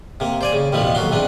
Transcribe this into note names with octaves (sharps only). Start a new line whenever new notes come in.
C3 A#3
C5 D5 G#5
C#3
A1 D#2 B2 E3 F3 G3
B1 A#3 F#4 C6
G#2 C3 E3 D4